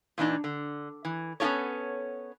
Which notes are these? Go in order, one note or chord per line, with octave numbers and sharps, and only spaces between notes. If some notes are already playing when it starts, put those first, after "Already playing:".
A#2 E3 D4 D#4
D3
E3
B3 C#4 D4 F4 A4 C#5